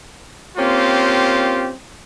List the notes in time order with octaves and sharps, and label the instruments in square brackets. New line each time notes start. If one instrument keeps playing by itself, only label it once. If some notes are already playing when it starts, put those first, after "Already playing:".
[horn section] A#3 C4 C#4 F4 G4